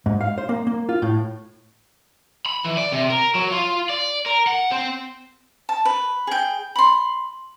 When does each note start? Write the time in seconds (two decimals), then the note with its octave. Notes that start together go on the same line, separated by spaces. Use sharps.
0.06 G#2
0.21 F5
0.38 C5
0.49 A#3
0.67 A#3
0.89 F4
1.02 A2
2.46 B5
2.64 E3
2.77 D5
2.92 C3
3.10 A#4
3.35 F#3
3.51 F4
3.89 D5
4.26 A#4
4.47 F#5
4.71 C4
5.69 A5
5.85 B4
6.27 G#4 G5
6.76 B5 C6